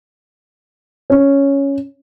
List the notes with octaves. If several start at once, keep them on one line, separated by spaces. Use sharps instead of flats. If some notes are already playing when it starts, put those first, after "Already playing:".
C#4